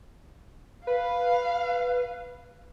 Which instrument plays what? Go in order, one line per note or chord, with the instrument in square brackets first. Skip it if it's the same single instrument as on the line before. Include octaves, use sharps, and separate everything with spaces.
[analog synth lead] B4 [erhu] F5